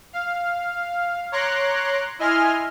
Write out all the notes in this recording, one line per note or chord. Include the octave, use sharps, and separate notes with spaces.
F5
C#5 A#5 C6 D6 F#6
E4 D#5 G#5 C6 F6